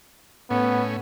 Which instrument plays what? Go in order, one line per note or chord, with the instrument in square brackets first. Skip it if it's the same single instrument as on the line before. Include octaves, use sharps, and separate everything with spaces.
[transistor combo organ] A2 C#4 [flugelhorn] B3